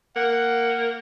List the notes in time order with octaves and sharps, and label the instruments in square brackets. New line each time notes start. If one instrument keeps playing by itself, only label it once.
[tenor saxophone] A#3 [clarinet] F#5